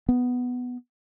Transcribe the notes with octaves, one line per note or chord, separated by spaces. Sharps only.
B3